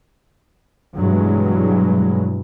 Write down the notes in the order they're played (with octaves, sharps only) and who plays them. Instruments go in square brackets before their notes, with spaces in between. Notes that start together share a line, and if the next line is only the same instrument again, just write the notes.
[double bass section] G2 B2 E3 F#3 G#3